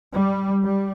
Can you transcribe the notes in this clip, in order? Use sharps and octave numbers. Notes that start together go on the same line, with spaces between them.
G3
G3